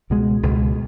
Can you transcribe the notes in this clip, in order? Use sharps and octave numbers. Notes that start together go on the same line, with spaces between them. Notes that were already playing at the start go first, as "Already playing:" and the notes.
C#2 B2 G#3
C#2 B2 G#3